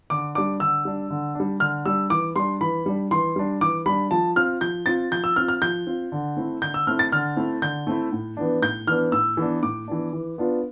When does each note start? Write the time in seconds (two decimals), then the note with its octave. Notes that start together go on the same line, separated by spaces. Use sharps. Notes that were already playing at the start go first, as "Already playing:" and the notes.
0.10 D3 D6
0.35 G3 D4 D6
0.60 D3 E6
0.85 G3 D4
1.10 D3
1.35 G3 D4
1.60 D3 F6
1.86 G3 D4 E6
2.10 E3 D6
2.36 G3 D4 C6
2.61 E3 B5
2.86 G3 D4
3.11 E3 C6
3.36 G3 D4
3.61 E3 D6
3.86 G3 D4 B5
4.11 F3 A5
4.36 C4 F4 F6
4.61 F3 G6
4.86 C4 F4 A6
5.11 F3 G6
5.24 E6
5.36 C4 F4 F6
5.48 F6
5.62 F3 G6
5.87 C4 F4
6.12 D3
6.37 A3 C4 E4
6.62 D3 G6
6.74 E6
6.87 A3 C4 E4 F6
6.99 A6
7.12 D3 F6
7.36 A3 C4 E4
7.62 D3 G6
7.87 A3 C4 E4
8.12 A2
8.37 E3 B3 D4
8.62 A2 G6
8.87 E3 B3 D4 F6
9.12 A2 E6
9.37 E3 B3 D4
9.63 A2 D6
9.88 E3 B3 D4
10.13 E3
10.38 B3 D4 F4